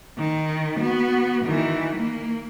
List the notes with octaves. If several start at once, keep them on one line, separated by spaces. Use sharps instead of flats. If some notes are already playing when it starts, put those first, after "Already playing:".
D#3
B3 F#4
D#3 E3
A#3